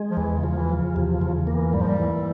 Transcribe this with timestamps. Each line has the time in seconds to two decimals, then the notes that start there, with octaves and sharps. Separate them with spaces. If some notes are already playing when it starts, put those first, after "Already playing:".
Already playing: G#3
0.11 F3
0.17 E2 E3
0.38 C#3
0.43 F3
0.57 E3
0.69 F3
0.75 C#3
0.95 E2 C3
1.15 C#3
1.21 E2
1.35 C#3
1.47 A#3
1.54 E3
1.73 G#2 G3
1.81 F3
1.88 G3
2.00 E3